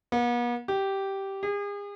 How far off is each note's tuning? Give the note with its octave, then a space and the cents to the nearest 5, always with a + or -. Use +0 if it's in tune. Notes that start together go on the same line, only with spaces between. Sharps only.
B3 -45
G4 -10
G#4 -40